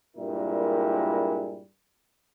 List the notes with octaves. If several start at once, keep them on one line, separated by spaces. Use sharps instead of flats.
G2 A#2 G3 G#3 E4 A#4